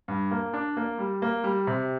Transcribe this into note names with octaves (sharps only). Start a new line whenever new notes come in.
G2
A#3
D4
A#3
G3
A#3
G3
C3